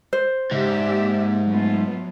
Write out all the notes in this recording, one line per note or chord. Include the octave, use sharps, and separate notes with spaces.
C5
G#2 C#3 G4 D5 E5
A#3
F#3 A3 B3 F4